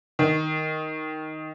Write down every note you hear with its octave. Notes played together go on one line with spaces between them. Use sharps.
D#3